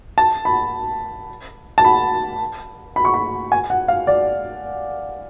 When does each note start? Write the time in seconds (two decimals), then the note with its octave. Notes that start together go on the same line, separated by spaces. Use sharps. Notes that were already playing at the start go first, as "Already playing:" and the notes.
0.18 A5
0.45 B5
1.78 A5
1.84 B5
2.96 B5
3.05 C#6
3.14 B5
3.52 G#5
3.70 F#5
3.88 F5
4.07 D5